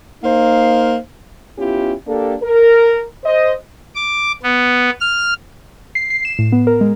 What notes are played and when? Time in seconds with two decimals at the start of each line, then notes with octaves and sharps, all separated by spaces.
0.23 A#3 D#4 C5 F5
1.58 B3 C#4 E4 F4 G4
2.07 A#3 D4 G4 A4
2.42 A#4
3.24 C5 D#5
3.95 D6
4.43 B3
5.00 F6
5.95 C7
6.10 C7
6.25 E7
6.39 A2
6.52 B3
6.67 A#4
6.81 G#3